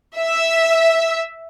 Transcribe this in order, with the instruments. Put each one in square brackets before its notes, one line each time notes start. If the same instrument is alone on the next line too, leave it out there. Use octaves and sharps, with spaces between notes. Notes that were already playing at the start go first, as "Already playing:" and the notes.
[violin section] E5